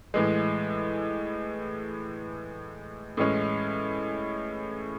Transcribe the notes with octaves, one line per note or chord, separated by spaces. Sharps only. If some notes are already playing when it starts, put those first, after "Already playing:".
A2 E3 G#3
A2 E3 G#3 C#4